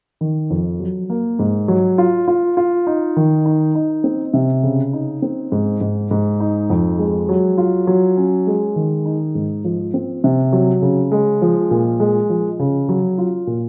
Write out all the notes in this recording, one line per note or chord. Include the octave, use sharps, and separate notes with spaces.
D#3
F2
F#3
A#3
G#2
F#3
F4
F4
F4
D#4
D#3
D#4
D#4
C4
C3
C#3
D#4
C4
G#2
G#2
G#2
D#4
F2
G#3
F#3
F4
F#3
C#4
G#3
D#3
D#4
G#2
F3
C4
C3
F#3
C#3
G#3
F3
A#2
G#3
F3
C#3
F#3
F4
A#2